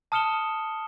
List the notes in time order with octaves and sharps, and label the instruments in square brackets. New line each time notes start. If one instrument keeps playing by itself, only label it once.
[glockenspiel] A5 D#6 F6 C#7 E7 G7